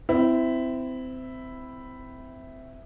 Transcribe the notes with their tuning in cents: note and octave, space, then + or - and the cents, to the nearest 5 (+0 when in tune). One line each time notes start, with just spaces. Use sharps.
C4 -25 E4 +0